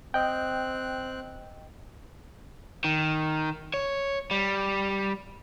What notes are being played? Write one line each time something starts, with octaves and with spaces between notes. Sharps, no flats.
C4 D#5 G5 F#6
D#3
C#5
G3